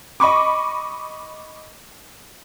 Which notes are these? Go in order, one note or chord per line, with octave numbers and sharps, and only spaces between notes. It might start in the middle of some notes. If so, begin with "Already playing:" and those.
D#5 B5 C#6 D6